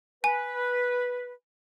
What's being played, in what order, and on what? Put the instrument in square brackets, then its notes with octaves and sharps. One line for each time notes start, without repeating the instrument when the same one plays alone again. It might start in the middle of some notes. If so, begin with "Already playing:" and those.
[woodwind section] B4 [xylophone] G#5